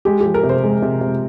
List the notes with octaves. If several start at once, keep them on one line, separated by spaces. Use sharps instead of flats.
G#3 G4
F3 G4
A#4
C3
C5
G#3
C3
C3